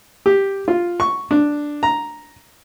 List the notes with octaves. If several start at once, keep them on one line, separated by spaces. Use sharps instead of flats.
G4
F4
C#6
D4
A#5